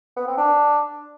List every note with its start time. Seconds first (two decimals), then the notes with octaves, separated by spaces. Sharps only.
0.17 B3
0.27 C4
0.38 D4